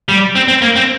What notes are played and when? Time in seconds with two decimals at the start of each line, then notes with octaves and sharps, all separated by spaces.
0.09 G3
0.35 C4
0.48 C4
0.62 A#3
0.76 C4